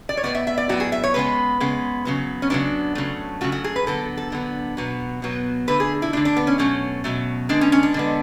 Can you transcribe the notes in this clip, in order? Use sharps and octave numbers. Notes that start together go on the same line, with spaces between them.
D5
C#5
A2 F#3 B3 D5
E5
E5
D5
A2 F#3 B3 F#4
G#4
E5
C#5
C#3 G#3 B3 B4
C#3 G#3 B3
C#3 F#3 B3
C#4
C#3 F#3 B3 D4
C#3 F#3 A3
C#3 F#3 A3 F#4
F#4
G#4
B4
D3 F#3 B3 A4
A4
D3 F#3 B3
B2 F#3 B3
B2 F#3 B3
D3 A3 B4
G#4
E4
D3 A3 D4
D4
B3
C#4
B2 F#3 A3 C#4
B2 F#3 A3
D3 G#3 B3 D4
C#4
C#4
D4
D3 G#3 B3